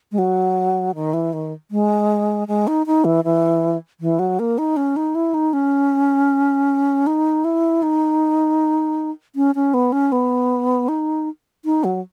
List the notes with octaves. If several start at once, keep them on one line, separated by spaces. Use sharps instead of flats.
G#3
F#3
D#3
E3
D#3
G#3
G#3
D#4
D#4
E3
E3
E3
F#3
A#3
D#4
C#4
D#4
E4
D#4
C#4
D#4
E4
D#4
C#4
C#4
B3
C#4
B3
D#4
D#4
F#3